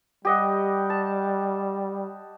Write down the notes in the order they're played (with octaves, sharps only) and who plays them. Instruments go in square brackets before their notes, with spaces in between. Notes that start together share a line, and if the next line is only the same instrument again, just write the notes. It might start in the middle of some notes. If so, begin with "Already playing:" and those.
[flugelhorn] G3 [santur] G4 D#5 F#5
[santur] A5